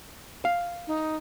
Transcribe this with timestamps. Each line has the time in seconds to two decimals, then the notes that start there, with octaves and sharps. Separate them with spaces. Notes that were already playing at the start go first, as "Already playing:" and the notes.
0.45 F5
0.87 D#4